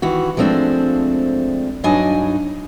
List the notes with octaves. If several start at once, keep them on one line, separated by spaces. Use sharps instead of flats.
D#3 E3 F#4
F3 G#3 A3 C4 D4
G2 F#3 D4 D#4 D#5 G#5